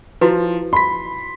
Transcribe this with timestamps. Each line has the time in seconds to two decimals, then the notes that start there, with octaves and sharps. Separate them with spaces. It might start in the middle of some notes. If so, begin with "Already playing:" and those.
0.21 F3 E4 F#4 B4
0.73 B5 C6 B6